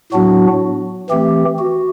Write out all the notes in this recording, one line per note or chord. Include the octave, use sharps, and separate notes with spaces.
A2 F#3 B3 D4 F#4
E3 A3 C4 G4
F#4